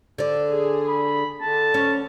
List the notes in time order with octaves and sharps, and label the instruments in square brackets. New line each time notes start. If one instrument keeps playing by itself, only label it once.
[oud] D3 D5
[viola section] G#4
[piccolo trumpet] B5
[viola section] D3 [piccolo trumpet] A5
[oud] C#4